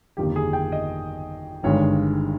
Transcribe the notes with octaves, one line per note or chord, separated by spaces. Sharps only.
G1 F2 D#3 A#3 G4
G#4
G5
D#5
G1 G2 D#3 G#3 C#5